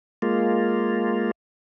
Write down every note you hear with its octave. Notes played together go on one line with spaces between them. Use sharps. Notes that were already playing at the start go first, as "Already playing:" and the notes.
G#3 A#3 F4